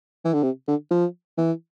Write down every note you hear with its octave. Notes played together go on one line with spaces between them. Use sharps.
E3
D3
C3
D3
F3
E3